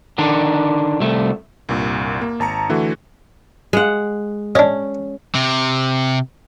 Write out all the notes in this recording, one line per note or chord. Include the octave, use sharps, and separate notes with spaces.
D3 D#3 D4
C2 A3
C2 G2 A#2
A#3
G#1 A5 A#5 C#7
D3 E3 A3 F#4
G#3 F#5
C#4 D4 D#5
C3